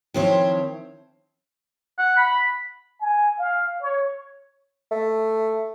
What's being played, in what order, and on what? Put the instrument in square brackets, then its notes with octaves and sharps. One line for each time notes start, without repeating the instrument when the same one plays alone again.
[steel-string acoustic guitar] D#3 F3 C4 E4 C5 C#5
[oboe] F#5
B5
[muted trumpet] G#5
F5
C#5
[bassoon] A3